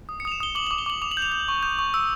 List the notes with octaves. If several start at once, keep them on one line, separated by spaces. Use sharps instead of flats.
D#6
C#7
D#6 F7
E7
D#6 G7
D6 F#7
D6 F#7
G7
D6 F#7
D6 F7
F#7
G6
F7
G6
C#6
G6
C#6
E6